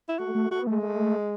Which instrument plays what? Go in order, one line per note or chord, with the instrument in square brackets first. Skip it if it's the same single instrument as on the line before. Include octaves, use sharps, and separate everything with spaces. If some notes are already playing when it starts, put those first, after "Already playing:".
[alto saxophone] E4
[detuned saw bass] A3 [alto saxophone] F#4
[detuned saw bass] A3
[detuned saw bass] A3 [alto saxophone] F#4
[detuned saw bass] B3
[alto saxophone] G#3 [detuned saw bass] A3
[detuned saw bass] A3